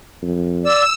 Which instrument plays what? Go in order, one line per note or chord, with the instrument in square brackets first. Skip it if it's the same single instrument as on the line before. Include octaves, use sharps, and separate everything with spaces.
[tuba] F2
[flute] D5 [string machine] E6